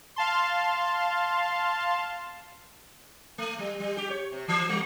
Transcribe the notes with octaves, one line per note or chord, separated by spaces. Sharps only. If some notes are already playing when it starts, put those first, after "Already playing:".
F5 A5 C6
A3
G3
G3
G4
C#5
C3
E3
G3